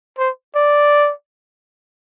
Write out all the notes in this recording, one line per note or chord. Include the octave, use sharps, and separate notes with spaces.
C5
D5